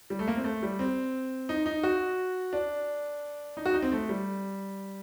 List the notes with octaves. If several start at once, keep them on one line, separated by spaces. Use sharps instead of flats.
G3
A3
A#3
C4
A3
G3
C4
D#4
D#4
F#4
D4
D#4
F#4
D#4
C4
A3
G3